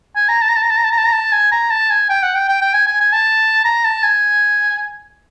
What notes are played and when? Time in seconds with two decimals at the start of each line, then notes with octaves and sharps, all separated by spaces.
0.16 G#5
0.29 A#5
0.42 A5
0.49 A#5
0.56 A5
0.63 A#5
0.70 A5
0.77 A#5
0.84 A5
0.92 A#5
0.98 A5
1.05 A#5
1.13 A5
1.32 G#5
1.52 A#5
1.70 A5
1.90 G#5
2.10 G5
2.23 F#5
2.35 G5
2.48 G5
2.62 G5
2.74 G#5
2.87 G#5
3.01 G#5
3.13 A5
3.65 A#5
3.85 A5
4.03 G#5